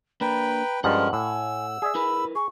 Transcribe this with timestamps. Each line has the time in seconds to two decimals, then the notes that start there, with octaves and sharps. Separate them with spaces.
0.21 A#3 D4 B4 G5 A#5 B5
0.84 G2 F3 G#3 C#4 A#4 C5 F#5
1.13 A2 G#5 E6
1.82 G#4 D5 E5
1.95 E4 A#4 B4 B5
2.35 G#4 C#6